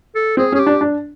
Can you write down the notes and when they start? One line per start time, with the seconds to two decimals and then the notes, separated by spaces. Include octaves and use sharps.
0.15 A4
0.37 C4 G#4
0.52 C#4
0.55 G#4
0.59 G4
0.67 D4
0.81 D4